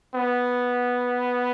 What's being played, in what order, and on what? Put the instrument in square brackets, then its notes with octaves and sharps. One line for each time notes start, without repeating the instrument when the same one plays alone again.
[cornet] B3